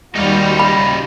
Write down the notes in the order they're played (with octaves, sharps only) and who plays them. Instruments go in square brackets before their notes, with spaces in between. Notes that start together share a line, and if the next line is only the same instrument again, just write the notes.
[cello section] D#2 F#4 [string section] G3 [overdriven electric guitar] D#4 F4
[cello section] C#3 [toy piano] B5